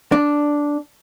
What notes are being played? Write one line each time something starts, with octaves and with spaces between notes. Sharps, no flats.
D4